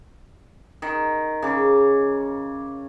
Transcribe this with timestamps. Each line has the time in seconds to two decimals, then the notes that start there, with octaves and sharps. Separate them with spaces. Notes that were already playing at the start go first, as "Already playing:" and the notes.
0.82 D#3
1.42 C#3 D6